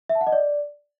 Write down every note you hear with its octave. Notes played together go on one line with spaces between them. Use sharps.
E5
A5
F#5
D#5
D5